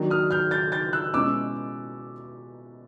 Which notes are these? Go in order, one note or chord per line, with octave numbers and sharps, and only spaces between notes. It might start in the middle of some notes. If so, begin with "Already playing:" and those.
Already playing: D#3 F#3 A#3 D4
D#6 F6
F6 G6
G6 A6
G6 A6
E6 F#6
B2 G#3 C#4 E4 D6 E6